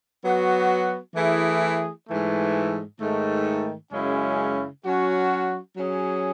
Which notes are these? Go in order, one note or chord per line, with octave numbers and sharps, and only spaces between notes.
F#3 B3 F#4
E3 A3 E4 G#4
G#2 E3 A3
G#2 D#3 A3
F#2 C#3 G#3 C#4 E4
F#3 C#4 F#4
F#3 C#4 G#4